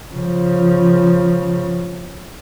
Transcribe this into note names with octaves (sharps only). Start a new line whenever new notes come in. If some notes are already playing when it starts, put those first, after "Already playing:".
C#3 F3